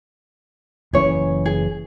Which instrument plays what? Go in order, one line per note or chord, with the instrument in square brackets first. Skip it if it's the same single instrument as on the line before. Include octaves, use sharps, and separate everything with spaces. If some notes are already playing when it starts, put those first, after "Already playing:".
[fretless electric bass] F#1 E3 C#4 [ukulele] G#4 C#5
[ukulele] G#4